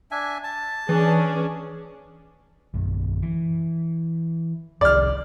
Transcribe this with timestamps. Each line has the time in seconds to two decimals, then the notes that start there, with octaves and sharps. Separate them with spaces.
0.11 D4 E5 G#5
0.44 A5
0.89 E3 C#4 D4 G#4
2.74 A#1 F#2
3.22 E3
4.81 F1 C2 F2 D5 F6